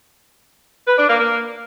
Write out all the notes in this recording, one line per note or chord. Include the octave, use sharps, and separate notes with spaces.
B4
D4
A#3
A#3